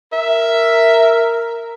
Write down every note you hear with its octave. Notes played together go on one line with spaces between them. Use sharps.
A#4 E5